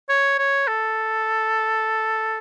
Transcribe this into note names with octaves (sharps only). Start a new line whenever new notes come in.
C#5
C#5
A4